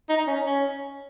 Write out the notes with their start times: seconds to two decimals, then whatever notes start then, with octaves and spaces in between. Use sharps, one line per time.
0.10 D#4
0.27 C#4
0.46 C#4